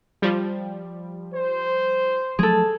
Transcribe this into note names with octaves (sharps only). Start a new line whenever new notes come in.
F3 G3
C5
F3 F#3 A3 G#4 A4